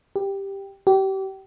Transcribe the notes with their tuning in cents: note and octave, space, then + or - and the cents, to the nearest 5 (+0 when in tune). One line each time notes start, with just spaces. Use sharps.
G4 +5
G4 -30